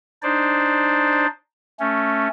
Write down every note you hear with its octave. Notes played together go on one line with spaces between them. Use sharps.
D4 D#4 C5 D5
A3 C#4